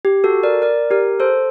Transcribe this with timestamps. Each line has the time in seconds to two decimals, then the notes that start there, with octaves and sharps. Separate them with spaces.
0.05 G4
0.24 F#4 A4
0.43 A#4 D5
0.62 A#4 D5
0.91 G4 A#4
1.20 A4 C5